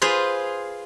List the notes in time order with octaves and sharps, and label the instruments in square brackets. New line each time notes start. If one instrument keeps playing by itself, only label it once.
[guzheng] F4 G#4 B4 C5